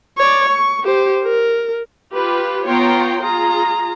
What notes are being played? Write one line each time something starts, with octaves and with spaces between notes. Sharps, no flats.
C#5 D5
C#6
G4 C5
A#4
F4 G4 B4
B3 F4 C#5 G5 A#5 C6
F4 G#4 A#5